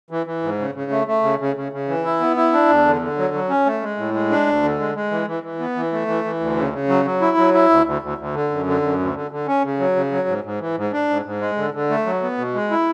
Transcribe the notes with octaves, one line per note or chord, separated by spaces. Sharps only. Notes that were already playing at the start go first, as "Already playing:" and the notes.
E3
E3
G#2
C#3
C#3
A3
A3
C#3
C#3
C#3
C#3
E3
E4
B3
E4
D4
E2
D3
D3
F#3
F#3
C#4
A3
G#3
A2
G#3
D4
D2
D3
G#3
G#3
E3
E3
E3
B3
E3
A3
E3
E3
D2
C#3
C#3
F#3
F#3
E4
F#3
E4
D2
D2
D2
D2
D3
F#2
D3
F#2
D2
D3
D3
C#4
C#3
F#3
C#3
F#3
G#2
G#2
E3
G#2
D4
G#2
G#2
G#3
D3
D3
A3
F#3
B3
B2
G#3
E4